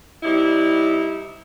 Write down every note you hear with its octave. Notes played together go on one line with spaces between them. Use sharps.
C3 G3 D#4 E4